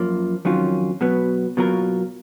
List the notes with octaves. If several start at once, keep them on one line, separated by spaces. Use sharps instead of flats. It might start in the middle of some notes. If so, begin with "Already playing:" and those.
Already playing: F#2 F3 A#3
F2 D#3 F#3 C#4 F4
B2 F#3 B3
B2 F#3 A#3 F4 A#4